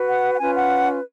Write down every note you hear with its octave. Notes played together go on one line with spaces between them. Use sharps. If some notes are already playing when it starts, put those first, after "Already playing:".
Already playing: F#4 B4
F#5
F#5
C#4 F4 B4 G#5
F#5